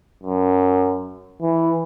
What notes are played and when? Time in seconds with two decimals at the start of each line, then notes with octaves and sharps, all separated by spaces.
0.23 F#2
1.41 E3